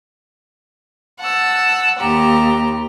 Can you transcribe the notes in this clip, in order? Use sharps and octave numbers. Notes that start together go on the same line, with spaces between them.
F#5 A5 E6
D#2 G4 A#5